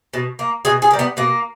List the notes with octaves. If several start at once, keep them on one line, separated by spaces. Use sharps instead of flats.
B2
A#3
B2 G#4
G#4
G3 A#3
B3
B2 A#3